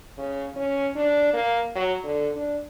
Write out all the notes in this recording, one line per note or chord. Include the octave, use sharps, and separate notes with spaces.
C#3
C#4
D4
A#3
F#3
D3
D4